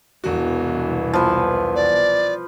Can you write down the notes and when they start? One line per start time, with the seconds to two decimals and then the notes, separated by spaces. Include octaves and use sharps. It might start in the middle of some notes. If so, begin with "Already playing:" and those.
0.24 E1 C2 B2 E3 F#4
1.13 F3 B4
1.75 D5